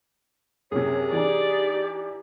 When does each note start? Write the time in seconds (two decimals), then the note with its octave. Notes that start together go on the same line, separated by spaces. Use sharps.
0.72 F#2 C3 G#4 C#5
1.12 E3 D4 D#4 G4 D5